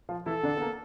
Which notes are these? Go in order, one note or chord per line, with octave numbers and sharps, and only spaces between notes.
F3 F4
E3 E4 A4
D3 D4
B3
A#3